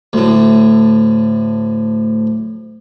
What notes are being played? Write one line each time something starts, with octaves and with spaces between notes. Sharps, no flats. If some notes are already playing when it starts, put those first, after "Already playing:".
D2 A2